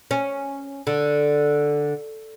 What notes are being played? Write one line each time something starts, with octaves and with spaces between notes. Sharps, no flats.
C#4
D3